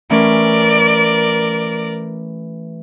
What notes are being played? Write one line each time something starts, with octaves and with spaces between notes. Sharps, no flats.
E3 A3 C#4 A#4 D5